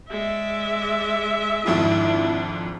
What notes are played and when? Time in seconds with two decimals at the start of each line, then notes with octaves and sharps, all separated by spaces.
0.11 G#3 D5 E5
1.66 G#1 F2 G#2 D4 E4